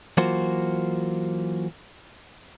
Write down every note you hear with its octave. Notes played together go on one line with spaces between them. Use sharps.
E3 F#3 A#3 F4 F#4 C5